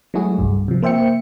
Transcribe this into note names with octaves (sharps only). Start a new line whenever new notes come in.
F#3 G#3 A3 E4 F#4 G#4
C2 G2
C3 F3
A#3 C5 E5 G5 C#7